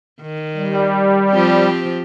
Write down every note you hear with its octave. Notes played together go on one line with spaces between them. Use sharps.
D#3
G3
F3 C4 G4